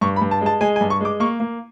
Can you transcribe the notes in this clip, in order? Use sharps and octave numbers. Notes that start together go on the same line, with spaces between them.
G2 C#6
B5
G2
A5
G#3
A5
G#3 G#5
G#5
G2
C#6
G#3 D6
A#3 C#6
A#3